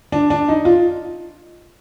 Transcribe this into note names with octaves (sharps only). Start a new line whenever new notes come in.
D4
D4
D#4
F4